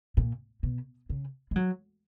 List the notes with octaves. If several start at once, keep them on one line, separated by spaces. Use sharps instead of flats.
A#2
B2
C#3
G#3
F#3